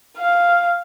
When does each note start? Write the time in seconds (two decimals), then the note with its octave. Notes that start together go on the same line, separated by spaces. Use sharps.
0.18 F5